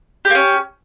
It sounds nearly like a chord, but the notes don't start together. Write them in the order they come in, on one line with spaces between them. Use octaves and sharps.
G4 A#3 C#4